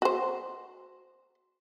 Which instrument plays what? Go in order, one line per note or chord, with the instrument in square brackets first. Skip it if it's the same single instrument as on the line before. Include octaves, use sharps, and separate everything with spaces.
[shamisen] F#4 C5